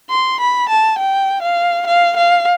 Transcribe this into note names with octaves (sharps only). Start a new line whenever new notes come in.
C6
B5
A5
G5
F5
F5
F5